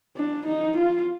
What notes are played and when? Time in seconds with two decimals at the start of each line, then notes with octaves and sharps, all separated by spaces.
0.16 D4
0.46 D#4
0.77 F4